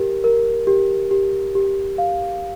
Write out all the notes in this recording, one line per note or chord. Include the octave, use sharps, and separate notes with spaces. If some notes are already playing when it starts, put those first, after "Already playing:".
Already playing: G4 A#4
A#4
G4
G4
G4
F5